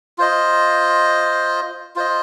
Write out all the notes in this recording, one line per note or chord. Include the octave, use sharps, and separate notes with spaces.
F4 C5 D#5
F4 C5 D#5